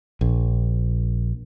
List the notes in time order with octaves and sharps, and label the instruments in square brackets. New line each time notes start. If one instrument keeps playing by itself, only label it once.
[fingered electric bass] A#1